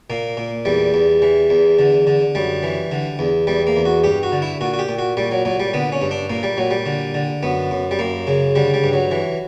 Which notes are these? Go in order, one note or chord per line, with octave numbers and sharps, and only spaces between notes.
A#2 A#3
A#2
E2 G3
E2
E3
E2
D3
D3
F#2 G3
E3
D3
E2
E2 G3
A#3
E2
F#4
G2 G4
F#4
D3
E4
A#2 F#4
F#4
G4
A#2
F#4
A#2 G3
F#3
A#2 F#3
G3
D3 B3
C#4
G2
D4
A#2 A#3
G3
A#2 F#3
G3
D3
D3
F#2 B3
F#2
G3
F#2 A#3
C#3
D3 G3
G3
G2
F#3
E3